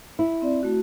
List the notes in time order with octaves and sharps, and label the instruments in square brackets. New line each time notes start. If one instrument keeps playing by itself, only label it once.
[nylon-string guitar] E4
[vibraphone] C4 D5
A3 F#4